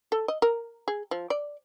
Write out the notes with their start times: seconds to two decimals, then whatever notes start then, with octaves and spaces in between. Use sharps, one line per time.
0.12 A4
0.28 D#5
0.42 A#4
0.88 G#4
1.11 F3
1.30 D5